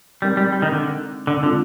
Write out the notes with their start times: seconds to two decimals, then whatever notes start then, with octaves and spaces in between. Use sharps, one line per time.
0.22 G3 G#3 C4 D#4 A#4
0.37 G3
0.52 G3
0.62 D#3
0.72 D3
1.27 D3
1.43 D3 G#3 C4 F4